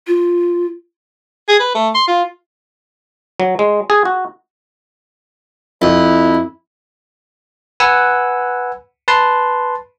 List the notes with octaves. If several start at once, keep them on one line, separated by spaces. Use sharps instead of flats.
F4
G#4
B4
A3
C6
F4
F#3
G#3
G#4
F#4
F2 E4
B4 F#5 G#5 E6
B4 A5 C6